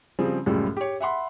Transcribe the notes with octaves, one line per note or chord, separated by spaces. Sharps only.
C#3 F3 G3 C4 G#4
C#2 F#2 A2 F3 G3
G4 C#5
E5 F#5 B5 C6